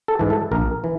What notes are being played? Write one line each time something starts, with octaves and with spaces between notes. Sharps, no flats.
A4
G#2 E3
A4
A#1 A#4
E3